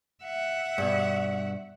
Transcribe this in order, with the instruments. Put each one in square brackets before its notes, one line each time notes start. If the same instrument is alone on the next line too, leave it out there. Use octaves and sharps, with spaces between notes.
[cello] E5 F#5
[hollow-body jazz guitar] G2 B2